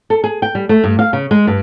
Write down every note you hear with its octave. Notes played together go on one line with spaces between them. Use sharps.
A4
G#4
G5
G3
A3
G2
F5
C#3
G#3
G2